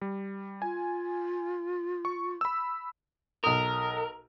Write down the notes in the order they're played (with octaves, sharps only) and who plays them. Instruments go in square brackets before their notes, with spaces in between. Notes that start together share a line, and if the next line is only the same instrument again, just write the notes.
[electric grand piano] G3
[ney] F4 [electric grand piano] G#5
[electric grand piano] C#6
B5 E6
[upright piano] B1 D#6 [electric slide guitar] A#4